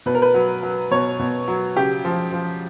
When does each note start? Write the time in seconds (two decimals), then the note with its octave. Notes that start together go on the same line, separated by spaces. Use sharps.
0.06 B2 B4
0.15 A#4
0.22 B4
0.34 F#3
0.63 F#3
0.91 B2 C#5
1.19 B2
1.48 F#3
1.76 C#3 G4
2.05 F3
2.33 F3